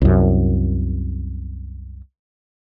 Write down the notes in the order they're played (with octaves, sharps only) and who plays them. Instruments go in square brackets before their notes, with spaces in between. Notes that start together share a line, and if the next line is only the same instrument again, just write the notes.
[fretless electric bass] C2 F#2